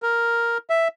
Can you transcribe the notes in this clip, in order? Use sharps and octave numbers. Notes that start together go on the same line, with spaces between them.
A#4
E5